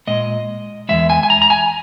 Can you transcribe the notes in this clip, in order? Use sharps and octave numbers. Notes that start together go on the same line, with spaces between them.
A#2 G#3 D#5
E2 D#3 G#3 E5
G#5
G#5
A#5
A#5
G#5